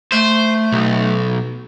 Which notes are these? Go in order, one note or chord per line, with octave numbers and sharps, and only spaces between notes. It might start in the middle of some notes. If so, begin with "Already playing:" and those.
A3 C5
B1